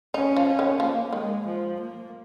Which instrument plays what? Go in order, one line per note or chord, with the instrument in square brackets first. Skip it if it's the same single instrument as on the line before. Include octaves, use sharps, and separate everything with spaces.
[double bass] C#4 [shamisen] D#4
[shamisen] F3
[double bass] C#4
[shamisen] D#3
[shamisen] F3 [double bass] A#3
[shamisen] D#3 [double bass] G#3
[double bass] F3
A#3